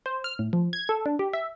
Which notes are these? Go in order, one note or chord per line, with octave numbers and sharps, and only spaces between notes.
C5
F6
A2
F3
G#6
A4
D4
G4
E5